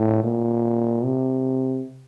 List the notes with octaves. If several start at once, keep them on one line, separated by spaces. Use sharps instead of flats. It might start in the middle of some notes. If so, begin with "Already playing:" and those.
Already playing: A2
A#2
C3